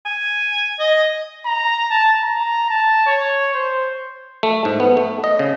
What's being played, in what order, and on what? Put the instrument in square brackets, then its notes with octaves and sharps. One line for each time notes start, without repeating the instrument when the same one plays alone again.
[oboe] G#5
[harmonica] D#5
[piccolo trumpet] A#5
A5
A#5
A5
C#5
C5
[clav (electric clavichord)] A3
G#2
B3
A3
D#5
C#3